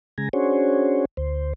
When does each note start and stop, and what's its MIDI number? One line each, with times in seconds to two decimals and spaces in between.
0.18 0.29 49
0.18 0.29 56
0.18 0.29 80
0.18 0.29 82
0.33 1.05 61
0.33 1.05 62
0.33 1.05 66
0.33 1.05 68
0.33 1.05 72
0.33 1.05 73
1.17 1.53 38
1.17 1.53 72